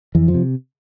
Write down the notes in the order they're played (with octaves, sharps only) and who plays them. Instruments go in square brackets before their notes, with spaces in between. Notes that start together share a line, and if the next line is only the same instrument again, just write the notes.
[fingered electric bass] F2 E3
F3
C3